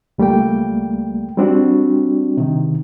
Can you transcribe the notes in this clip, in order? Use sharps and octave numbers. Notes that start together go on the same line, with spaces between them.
C#2 G3 A3 A#3 G5
G3 C4 D4 F#4
C3 D#3